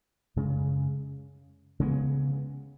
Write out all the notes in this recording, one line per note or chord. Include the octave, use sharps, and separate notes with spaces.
F#2 C#3 G#3
C#3 G#3 B3